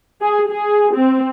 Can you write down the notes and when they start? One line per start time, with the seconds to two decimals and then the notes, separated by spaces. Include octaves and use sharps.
0.22 G#4
0.50 G#4
0.94 C4